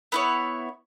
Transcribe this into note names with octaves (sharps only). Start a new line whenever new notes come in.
B3 E4 C#5